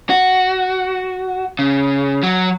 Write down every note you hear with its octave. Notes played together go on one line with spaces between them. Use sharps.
F#4
C#3
F#3